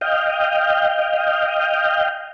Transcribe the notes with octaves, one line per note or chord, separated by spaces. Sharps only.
D#5 F5 G5